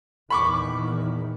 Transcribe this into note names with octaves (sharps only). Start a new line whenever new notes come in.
E2 A#2 D#3 B5 C#6 D6